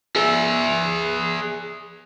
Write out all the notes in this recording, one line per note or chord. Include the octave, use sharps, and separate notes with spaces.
G#4 E5